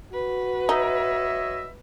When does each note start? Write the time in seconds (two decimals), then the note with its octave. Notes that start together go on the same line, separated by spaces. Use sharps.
0.13 F#4 B4
0.69 D#4 C#5 D#5 E5